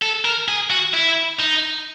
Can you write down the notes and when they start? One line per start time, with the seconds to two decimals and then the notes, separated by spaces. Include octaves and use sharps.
0.02 A4
0.25 A#4
0.48 G#4
0.70 F#4
0.93 E4
1.39 D#4